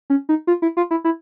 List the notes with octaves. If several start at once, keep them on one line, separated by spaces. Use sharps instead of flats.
C#4
D#4
F4
E4
F4
E4
E4